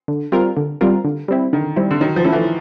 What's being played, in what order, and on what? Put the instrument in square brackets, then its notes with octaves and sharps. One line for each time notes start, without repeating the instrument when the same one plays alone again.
[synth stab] D3
G3 C4 F4 A#4
D3
G3 C4 F4 A#4
D3
G3 C4 E4
[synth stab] D3 [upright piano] D#3
[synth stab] G3 C4 E4
[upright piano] D3
[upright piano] D#3 [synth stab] F#3
[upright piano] F3
[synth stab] A3 C#4 E4 A4
[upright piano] E3